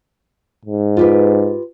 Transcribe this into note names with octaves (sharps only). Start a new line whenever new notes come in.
G#2
F4 G4 B4